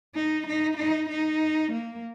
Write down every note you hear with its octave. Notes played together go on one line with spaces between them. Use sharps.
D#4
D#4
D#4
D#4
A#3